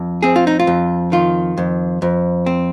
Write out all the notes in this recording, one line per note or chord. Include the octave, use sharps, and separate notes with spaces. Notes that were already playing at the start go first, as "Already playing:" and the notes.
Already playing: F2
C4 G#4
F4
D#4
F4
F2
D#3 F4
F2
F2
C4